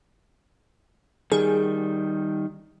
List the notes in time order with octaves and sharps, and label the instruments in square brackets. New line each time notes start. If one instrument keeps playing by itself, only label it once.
[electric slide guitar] D#3 G3 [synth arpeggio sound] G#4